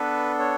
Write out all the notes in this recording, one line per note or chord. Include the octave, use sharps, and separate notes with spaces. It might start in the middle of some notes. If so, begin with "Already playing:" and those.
Already playing: B3 D4 A4 B4
C#5